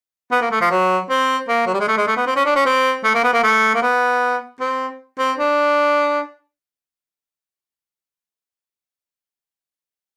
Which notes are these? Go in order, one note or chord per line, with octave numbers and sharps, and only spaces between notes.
B3
A#3
A3
F3
F#3
C4
A#3
F#3
G3
G#3
A3
G#3
A3
B3
C4
C#4
D4
C#4
C4
A3
A#3
B3
A#3
A3
A#3
B3
C4
C4
D4